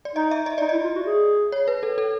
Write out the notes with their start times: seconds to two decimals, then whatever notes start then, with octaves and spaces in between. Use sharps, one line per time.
0.05 D5
0.15 D#4 D#5
0.31 E5
0.46 D#5
0.58 D#4 D5
0.69 E4 D#5
0.84 F4
0.95 F#4
1.06 G#4
1.52 C#5
1.68 B4
1.83 A4
1.98 A4